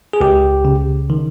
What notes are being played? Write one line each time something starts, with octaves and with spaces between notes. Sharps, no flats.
G#4
C#2 G4
C#3
D#3